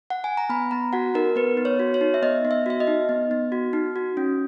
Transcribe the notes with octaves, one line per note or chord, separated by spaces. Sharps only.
F#5
G#5
A#5
B3 B5
B3 A#5
F#4 F#5
D#4 A#4
B3 B4
B3
C#5
F#4
C#5
D#4
E5
B3 D#5
B3
E5
F#4 E5
D#5
D#4
B3
B3
F#4
D#4
F#4
C#4